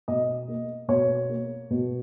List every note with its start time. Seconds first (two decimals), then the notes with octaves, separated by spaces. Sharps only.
0.08 B2 D#5
0.48 A#3
0.88 B2 C#5
1.29 A#3
1.70 B2